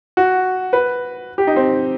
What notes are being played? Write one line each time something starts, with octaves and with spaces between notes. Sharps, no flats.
F#4
B4
G4
D#4
C4